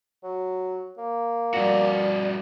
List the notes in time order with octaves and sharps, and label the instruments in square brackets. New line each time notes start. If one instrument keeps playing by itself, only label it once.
[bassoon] F#3
A#3
[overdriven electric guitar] G2 F#4 [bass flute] D5